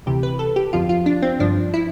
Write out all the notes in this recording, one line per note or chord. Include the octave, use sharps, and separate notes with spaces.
D2 C3 E3 G4
B4
A4
G4
G1 F2 D3 F3 F4
F4
D4
C4
G1 G2 F3 D4
E4